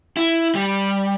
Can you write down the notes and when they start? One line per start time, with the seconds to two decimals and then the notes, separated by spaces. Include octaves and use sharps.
0.17 E4
0.55 G3